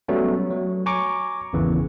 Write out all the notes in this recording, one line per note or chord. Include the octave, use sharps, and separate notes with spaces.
F#3 G3 A3 B3 C#4
F#3
G#5 A#5 C#6 D6
G#1 E2 C#3 E3